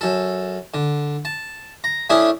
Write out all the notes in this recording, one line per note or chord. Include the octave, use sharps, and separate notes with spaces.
F#2 A4
D3
A5
A#5
A3 C#4 D4 E4 G#4